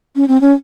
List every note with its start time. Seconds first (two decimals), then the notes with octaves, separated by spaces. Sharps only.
0.16 C#4
0.28 C4
0.41 C#4